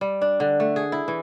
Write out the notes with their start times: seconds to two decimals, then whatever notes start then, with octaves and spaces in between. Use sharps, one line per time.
0.01 G3
0.21 D4
0.40 D3
0.60 A3
0.76 G#4
0.92 E4
1.08 E3